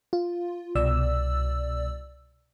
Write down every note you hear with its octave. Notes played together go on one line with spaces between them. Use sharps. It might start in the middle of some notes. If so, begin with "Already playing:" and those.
F4
C2 B2 D5 E6